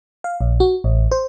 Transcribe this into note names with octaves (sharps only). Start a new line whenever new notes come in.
F5
A#1
F#4
A1
C5